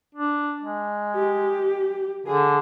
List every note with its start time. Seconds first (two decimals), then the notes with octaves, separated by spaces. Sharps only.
0.15 D4
0.63 G#3
1.15 G4
2.27 D3 G#4